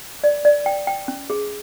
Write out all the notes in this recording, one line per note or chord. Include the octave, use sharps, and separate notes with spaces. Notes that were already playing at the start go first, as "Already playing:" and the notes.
D5
D5
G5
G5
C#4
G#4